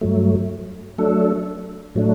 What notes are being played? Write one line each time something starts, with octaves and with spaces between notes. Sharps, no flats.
G2 F#3 A3
F#3 A3 D4 A4
A2 F#3 A3 D4